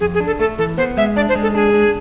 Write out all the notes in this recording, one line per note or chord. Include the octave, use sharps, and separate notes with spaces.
F2 G#4
G#4
D4
A4
A3 A4
E3 A4
B3 C5
G#3 E5
D4 D5
C5
G#3
A4
D4 G#4
D4